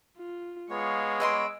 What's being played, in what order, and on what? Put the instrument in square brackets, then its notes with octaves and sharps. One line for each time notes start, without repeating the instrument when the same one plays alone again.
[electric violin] F4
[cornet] G#3 [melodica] B3 C#5 [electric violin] F5 C#6
[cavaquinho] B4 D#5 C6 [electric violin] E6 D7